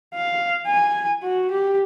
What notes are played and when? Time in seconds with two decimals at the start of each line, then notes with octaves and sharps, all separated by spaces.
0.15 F5
0.67 G#5
1.23 F#4
1.52 G4